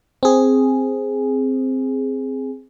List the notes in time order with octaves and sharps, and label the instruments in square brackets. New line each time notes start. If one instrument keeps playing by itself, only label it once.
[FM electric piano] C4 G#4